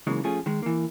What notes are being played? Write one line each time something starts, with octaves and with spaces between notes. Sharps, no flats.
C#3 E3 F#3 G#3 A#3 D#4
F3 A3 C#4 F4 G#4
D#3 G#3
E3 A#3